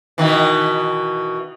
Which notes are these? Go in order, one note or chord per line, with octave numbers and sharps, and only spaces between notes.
B2 D#3 E3